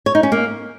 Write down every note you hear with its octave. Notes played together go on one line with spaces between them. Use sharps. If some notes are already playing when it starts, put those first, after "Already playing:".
C#5
D#4
C#4
A#3